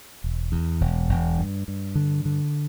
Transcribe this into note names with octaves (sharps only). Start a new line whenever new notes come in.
E1
E2
E1
E1
G2
G2
D3
D3